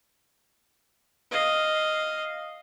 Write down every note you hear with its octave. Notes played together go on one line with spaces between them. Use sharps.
D#5 F5